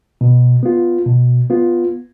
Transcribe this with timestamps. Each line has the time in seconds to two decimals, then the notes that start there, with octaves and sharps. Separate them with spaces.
0.21 B2
0.63 B3 F4
1.06 B2
1.50 B3 F4